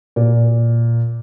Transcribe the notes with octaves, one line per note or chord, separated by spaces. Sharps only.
A#2